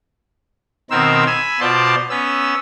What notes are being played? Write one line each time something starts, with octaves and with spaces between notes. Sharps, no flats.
B2 D#3 C4 A#4 C5 E6
G#5 B5 E6
B2 F4 C5 D5 A5 C6
B3 C#4 E6